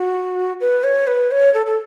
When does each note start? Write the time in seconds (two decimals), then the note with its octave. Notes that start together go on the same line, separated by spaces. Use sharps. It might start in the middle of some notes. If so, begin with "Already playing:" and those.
Already playing: F#4
0.61 B4
0.84 C#5
1.07 B4
1.31 C#5
1.54 A4
1.66 A4